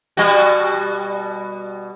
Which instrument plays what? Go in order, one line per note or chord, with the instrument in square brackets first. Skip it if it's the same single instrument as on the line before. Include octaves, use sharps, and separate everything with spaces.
[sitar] B2 G3 F#4